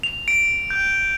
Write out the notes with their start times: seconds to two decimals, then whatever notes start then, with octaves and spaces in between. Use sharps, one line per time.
0.03 F7
0.28 D7
0.70 G6